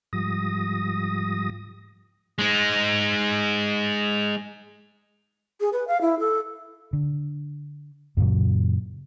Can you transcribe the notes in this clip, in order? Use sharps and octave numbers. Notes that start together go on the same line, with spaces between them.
G#2 F3 G3 D#6 A#6
G#3 D#4
G#4
B4
F5
E4
A4
D3
F#2 A#2 C#3 F#3